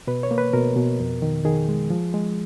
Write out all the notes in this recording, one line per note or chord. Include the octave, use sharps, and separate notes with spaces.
B2 B4
C#5
A#3
B4
B2 A#4
B2
F2
D#3
D#3 G#4
G#3
F3
G#3